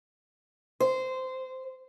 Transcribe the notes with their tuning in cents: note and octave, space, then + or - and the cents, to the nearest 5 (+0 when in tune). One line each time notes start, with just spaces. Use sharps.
C5 -15